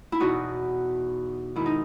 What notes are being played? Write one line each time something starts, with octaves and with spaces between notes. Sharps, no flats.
E4
E2 B2 D#4 F#4
G#2 D#3 E4
D#4